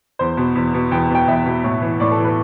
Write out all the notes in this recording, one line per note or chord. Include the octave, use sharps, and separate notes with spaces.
E2 C5
B2
E2
B2
E2 G5
B2 G5
E2 E5
B2
A2
E3
A2 D5
A4
E3
B4